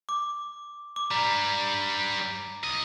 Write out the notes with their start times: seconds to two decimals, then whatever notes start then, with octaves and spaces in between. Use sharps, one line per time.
0.09 D6
0.96 D6
1.11 G2 G3 A#5
2.64 C#2 D#5